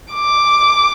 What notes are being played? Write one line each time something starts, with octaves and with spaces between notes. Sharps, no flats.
D6